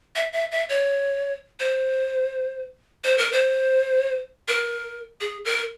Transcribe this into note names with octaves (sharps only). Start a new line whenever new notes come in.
E5
E5
E5
C#5
C5
C5
A#4
C5
A#4
G#4
A#4